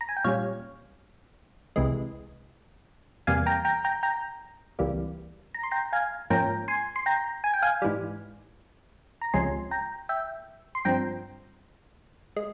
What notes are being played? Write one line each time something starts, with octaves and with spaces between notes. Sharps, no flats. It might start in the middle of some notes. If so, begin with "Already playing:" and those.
A#5
G#5
G5
A#2 G3 C#4 C#5 F5
C2 C3 E3 G#3
E2 C3 G3 A#3 F5 G#5
G5 A#5
G5 A#5
G5 A#5
G5 A#5
C#2 C3 E3 G3 A#3
A#5
C6
G5 A#5
F5 G#5
G#2 F3 A#3 C#4 G5 A#5
G#5 C6
C6
G5 A#5
G#5
G5
F5 G#5
G#2 E3 G3
A#5
C#2 C3 F3 G#3 C#4 G#5 C6
G5 A#5
E5 G5
C6
G2 F3 C4 G5 A#5
G#3